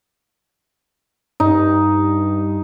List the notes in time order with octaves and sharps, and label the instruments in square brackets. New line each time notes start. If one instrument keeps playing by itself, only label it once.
[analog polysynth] G2 [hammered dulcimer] D#4